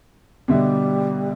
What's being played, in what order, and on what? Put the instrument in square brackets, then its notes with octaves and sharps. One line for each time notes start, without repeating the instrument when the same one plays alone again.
[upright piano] B2 D3 E5 [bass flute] G3